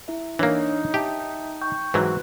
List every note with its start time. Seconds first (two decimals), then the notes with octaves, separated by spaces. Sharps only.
0.08 E4 E5
0.39 E3 A#3 D4 D#4 C#5
0.94 G4 E5 G5 A5
1.62 G5 C#6 G6
1.94 G#2 E3 F#3 F#4 B4 F#6